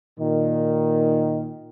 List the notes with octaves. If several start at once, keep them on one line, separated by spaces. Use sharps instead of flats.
A#2 D#3